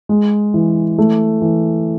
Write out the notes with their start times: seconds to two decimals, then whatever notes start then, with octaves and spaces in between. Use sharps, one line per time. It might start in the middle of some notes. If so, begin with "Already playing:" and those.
0.09 G#3
0.54 E3
0.98 A3
1.42 E3